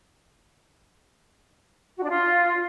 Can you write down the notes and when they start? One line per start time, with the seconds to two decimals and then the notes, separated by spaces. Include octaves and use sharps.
1.98 F#4
2.03 D4
2.09 F4